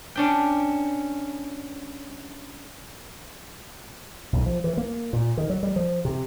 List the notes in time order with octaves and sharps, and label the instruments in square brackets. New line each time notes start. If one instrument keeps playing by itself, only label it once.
[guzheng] C#4 D4 G5
[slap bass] B1
F3
E3
A#3
A#2
D#3
F#3
G3
F3
C3